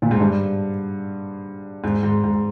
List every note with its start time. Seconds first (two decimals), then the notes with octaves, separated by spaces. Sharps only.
0.02 A#2
0.11 G#2
0.20 G2
1.84 G#2
2.03 G#2
2.24 G#2